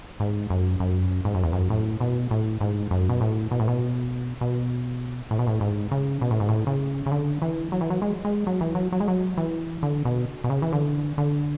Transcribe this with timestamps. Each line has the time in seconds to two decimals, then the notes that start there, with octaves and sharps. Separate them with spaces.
0.20 G#2
0.50 F#2
0.80 F#2
1.25 G#2
1.34 F#2
1.43 E2
1.53 F#2
1.70 A2
2.00 B2
2.31 A2
2.61 G#2
2.91 F#2
3.09 B2
3.21 A2
3.51 B2
3.60 A2
3.68 B2
4.41 B2
5.31 A2
5.39 B2
5.47 A2
5.61 G#2
5.91 C#3
6.21 B2
6.31 A2
6.40 G#2
6.49 A2
6.67 C#3
7.06 C#3
7.12 D3
7.42 E3
7.72 F#3
7.81 E3
7.90 F#3
8.02 G#3
8.25 G#3
8.47 F#3
8.61 E3
8.75 F#3
8.92 F#3
9.00 G#3
9.08 F#3
9.37 E3
9.83 D3
10.05 B2
10.44 B2
10.50 C#3
10.62 E3
10.73 D3
11.18 D3